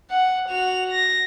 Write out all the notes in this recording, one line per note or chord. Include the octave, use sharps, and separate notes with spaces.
F#5
F#4 F7
A#6